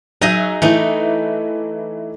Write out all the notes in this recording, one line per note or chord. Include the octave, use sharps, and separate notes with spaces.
F#3 D#4 G#4 D#5 E5
E3 A3 D#4 E4